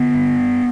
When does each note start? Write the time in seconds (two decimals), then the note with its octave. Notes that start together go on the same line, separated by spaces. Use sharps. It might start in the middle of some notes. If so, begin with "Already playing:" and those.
Already playing: D3 B3
0.14 G2